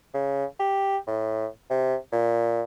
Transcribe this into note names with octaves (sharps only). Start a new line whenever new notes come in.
C#3
G4
A2
C3
A#2